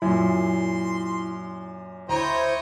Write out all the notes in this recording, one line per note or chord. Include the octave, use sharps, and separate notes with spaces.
F#2 A#2 E4 C6
D2 E4 C5 C#5 D#5 G5 A#5